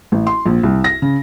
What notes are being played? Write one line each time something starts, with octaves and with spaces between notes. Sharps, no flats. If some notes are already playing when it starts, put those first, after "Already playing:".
A1
C6
A#1
C2
A#6
C#3